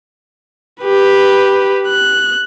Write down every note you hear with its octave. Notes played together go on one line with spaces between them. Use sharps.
G4 B4
F#6